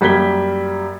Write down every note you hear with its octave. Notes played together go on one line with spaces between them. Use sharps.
F#2 G3 A#3 G#6 B6 G7